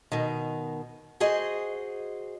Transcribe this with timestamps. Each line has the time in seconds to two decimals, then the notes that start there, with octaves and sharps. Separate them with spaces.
0.12 B2 D#3
1.20 F#4 G#4 C5 D#5